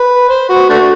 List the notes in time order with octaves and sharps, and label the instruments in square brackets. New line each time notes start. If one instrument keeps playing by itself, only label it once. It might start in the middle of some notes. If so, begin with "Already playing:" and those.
Already playing: [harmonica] B4
C5
F#4
A3 D4 F#4